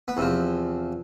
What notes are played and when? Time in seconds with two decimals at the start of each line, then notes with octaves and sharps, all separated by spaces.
0.08 B3
0.17 E2 C3 F3